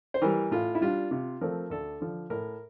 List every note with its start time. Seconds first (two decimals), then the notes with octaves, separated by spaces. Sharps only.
0.14 C5
0.22 E3 G3 A#4
0.51 A2 F4
0.75 E4
0.81 G3 D4 F4
1.11 C3 F4
1.41 F3 A3 C4 A#4
1.70 D2 A4
2.00 D3 F3
2.30 A2 A#4